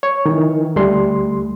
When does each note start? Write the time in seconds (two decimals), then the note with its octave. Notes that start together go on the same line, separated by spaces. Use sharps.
0.03 C#5
0.26 D#3 E3
0.76 D2 G3 A3 C6